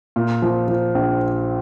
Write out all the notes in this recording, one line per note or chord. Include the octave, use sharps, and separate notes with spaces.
A#2
F3
F3
A#1